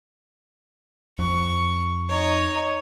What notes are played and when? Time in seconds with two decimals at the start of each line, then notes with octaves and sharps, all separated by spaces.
1.19 F2 C#6
2.09 D#4 C#5